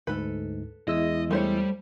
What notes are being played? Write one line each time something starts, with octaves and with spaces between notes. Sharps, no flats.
D2 G#2 A4 B4
E2 G#3 E4 D#5 E6
G3 A3 C5 C#5